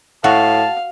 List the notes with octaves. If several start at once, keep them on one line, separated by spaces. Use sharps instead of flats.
A2 F#4 F5 A5